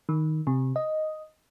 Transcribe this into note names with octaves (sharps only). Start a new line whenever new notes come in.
D#3
C3
D#5